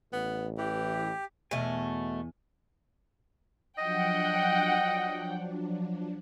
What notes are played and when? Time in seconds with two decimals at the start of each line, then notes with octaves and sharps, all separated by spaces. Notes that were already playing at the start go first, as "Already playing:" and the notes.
0.13 A1 B3
0.58 E3 G4
1.51 E2 G2 B2 A3 G#5
3.79 F3 F#3 D4 D#5 F#5 G5